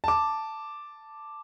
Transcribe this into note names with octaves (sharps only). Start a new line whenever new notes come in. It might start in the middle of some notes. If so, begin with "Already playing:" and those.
A5 D6